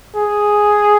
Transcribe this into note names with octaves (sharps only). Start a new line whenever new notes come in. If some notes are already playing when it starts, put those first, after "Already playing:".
G#4